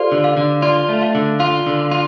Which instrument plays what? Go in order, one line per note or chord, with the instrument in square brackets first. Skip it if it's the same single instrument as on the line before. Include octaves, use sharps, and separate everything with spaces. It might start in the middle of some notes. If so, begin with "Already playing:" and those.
Already playing: [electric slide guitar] F4 [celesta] G4 A4 C5 D5
[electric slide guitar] D3
[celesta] F5
[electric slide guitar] D3
[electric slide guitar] F4 [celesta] D5
[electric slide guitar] A3
[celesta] F5
[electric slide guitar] D3
[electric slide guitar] F4 [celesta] F5
[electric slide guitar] D3
F4